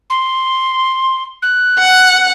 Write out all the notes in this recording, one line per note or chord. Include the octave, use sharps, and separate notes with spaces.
C6
F#6
F#5